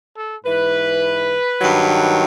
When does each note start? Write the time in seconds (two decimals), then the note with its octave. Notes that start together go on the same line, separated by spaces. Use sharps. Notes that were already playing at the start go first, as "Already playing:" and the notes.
0.16 A4
0.45 G#2 E3 B4
1.61 G2 D#3 F#3